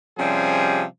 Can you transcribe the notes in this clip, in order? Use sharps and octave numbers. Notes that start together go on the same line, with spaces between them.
C3 F3 G3 C#4 G#4